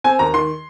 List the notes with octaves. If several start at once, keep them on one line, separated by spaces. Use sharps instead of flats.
C4 G#5
D#2 A#5
D#3 C6